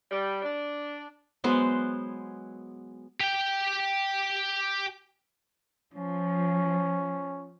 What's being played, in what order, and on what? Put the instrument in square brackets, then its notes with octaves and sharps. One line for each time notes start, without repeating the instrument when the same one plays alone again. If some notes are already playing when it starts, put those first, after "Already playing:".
[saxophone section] G3
D4
[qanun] F#3 G#3 B3 C5
[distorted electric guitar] G4 G5
[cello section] F3 [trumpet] C#4